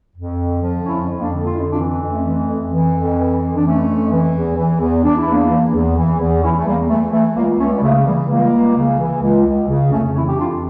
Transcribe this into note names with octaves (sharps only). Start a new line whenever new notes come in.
F2
D3
F3
F2 C#4 E4
F2
A#3 D4
D3
F4
F2 C#4 E4
D4 F4
E3
F2
A3 C#4
E3
F2
E3
F2
E3
F2
D4
E3 A3 C#4
F2
E3
E2
E3
E2
E3 D4
E4
E2 A#3 D4
E3
E2
E3
E2
E3 C#4 E4
A3
E2 G3 A#3
E3 A3
E3 A3
C#2 G3 A#3
C#2 A3 C#4
G3
C#3 A3
E3 G3 A#3
C#2 G3 A#3
C#2
C#3
E3
C#2
C#2
C#3
F2 A3 C#4
E3 C#4 E4
G4
F2 D4 F4